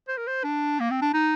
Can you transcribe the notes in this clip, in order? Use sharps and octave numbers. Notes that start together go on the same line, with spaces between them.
C5
A#4
C5
D4
A#3
C4
D4
D#4